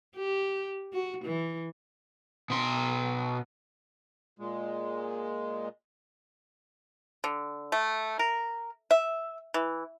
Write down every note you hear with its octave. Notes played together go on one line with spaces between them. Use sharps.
G4
F#4
E3
B2 C6
A#2 G#3
D3
A3
A#4
E5
E3